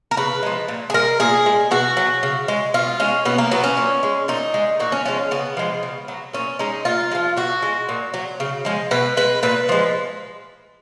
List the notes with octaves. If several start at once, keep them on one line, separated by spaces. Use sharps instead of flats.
A#4
C#3 B4
F3 G#3
A#2
G#4
G#3 A#4
A#2 G#4
G#3
B2 F#4
F#3
C#3
G#3
B2 F4
G#3 C#4
B2 B3
A#3
F#3 B3
C#4
A#2
G#3
A#2 D#4
G#3
A#2 F#4
C#4
F3 G#3 C#4
C#3 B3
F3 G#3
C#3
F#3
A#2 C#4
G#3 D#4
A#2 F4
G#3
F3
B2 F#4
G#3
A#2
F#3
C#3
F3 G#3
B2 B4
G#3 B4
A#2 B4
F3 G#3